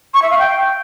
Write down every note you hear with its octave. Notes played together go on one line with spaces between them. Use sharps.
C#6
E5
F5
G5